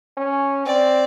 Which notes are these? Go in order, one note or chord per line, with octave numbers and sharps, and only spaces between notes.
C#4
C4 D5